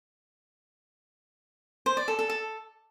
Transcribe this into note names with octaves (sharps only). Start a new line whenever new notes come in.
C5
D5
A4
A4
A4